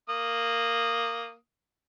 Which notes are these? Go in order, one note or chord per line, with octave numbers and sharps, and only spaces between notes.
A#3 D#6